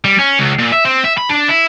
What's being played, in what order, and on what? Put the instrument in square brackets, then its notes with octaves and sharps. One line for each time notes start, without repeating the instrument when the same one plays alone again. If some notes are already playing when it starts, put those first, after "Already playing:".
[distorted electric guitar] G3
C#4
C#2
A#2
E5
C4
E5
B5
D4
E4